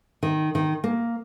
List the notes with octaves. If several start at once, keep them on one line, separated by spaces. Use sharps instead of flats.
D#3
D#3
A#3